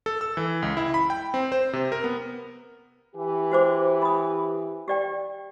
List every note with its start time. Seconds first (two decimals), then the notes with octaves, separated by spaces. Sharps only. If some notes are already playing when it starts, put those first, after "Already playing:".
0.06 A4
0.21 E6
0.37 E3
0.62 C#2
0.77 E4
0.94 B5
1.10 G5
1.34 C4
1.52 C5
1.73 C3
1.92 A#4
2.04 B3
3.16 E3 G4
3.52 F#4 C5 D6
4.02 B5 D#6
4.88 G4 D5 G5